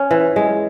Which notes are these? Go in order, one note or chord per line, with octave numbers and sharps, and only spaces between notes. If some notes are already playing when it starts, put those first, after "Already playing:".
Already playing: C#4
E3
G#3